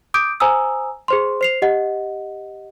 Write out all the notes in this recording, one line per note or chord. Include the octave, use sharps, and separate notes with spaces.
D6 D#6 G6 D7
C5 G#5 A#5 D#6 E6
G#4 C5 C6
C5 C7 F7
G4 D#5 F#5